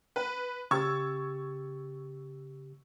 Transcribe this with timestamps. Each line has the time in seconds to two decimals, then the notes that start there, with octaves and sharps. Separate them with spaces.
0.16 B4
0.71 C#3 G4 C#6 E6 G#6 A6